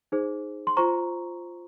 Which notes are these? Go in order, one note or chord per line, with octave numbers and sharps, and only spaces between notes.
D#4 G#4 C5
C6
F4 C5 A#5 C#6